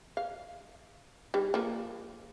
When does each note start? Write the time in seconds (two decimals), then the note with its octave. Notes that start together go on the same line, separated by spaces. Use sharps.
0.17 F5
1.34 G3 D#4
1.54 F3 A#3